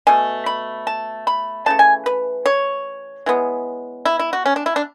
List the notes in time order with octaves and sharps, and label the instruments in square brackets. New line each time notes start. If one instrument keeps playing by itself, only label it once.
[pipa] B2 A3 G#5
B5
A5
B5
C#3 E3 A3 A5
G#5
B4
C#5
E3 G#3 B3
E4
E4
F#4
C#4
D4
E4
D4